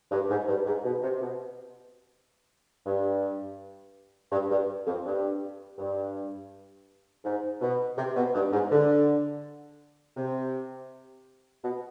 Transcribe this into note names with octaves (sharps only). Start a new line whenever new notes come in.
G2
G#2
G2
G#2
B2
C3
B2
G2
G2
G2
F2
G2
G2
G#2
B2
C3
B2
G2
G#2
D3
C3
B2